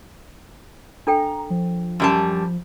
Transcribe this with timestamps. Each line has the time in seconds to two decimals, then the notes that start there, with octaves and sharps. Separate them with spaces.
1.07 D4 A4 G5 A#5
1.50 F3
2.00 F#2 G3 A5